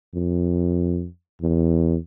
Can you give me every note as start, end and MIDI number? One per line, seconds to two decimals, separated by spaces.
0.15 1.07 41
1.42 1.97 40